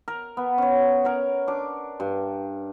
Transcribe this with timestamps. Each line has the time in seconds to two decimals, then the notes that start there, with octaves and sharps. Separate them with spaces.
0.08 A#4
0.37 B3
0.58 C#4 C#5
1.04 A#4 C#5 F#5
1.47 D4 D6
2.00 G2